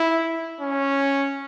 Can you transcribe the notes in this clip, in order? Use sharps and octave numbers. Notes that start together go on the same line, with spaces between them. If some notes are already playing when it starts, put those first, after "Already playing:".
Already playing: E4
C#4